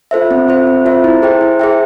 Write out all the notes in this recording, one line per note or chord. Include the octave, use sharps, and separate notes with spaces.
F4 A4 C5 E5
C4
F4 A4 C5 E5
C4
F4 A4 C5 E5
E4
G#4 C5 E5 G5
E4
G#4 C5 E5 G5